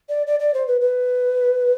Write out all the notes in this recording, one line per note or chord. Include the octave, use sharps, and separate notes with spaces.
D5
D5
D5
C5
B4
B4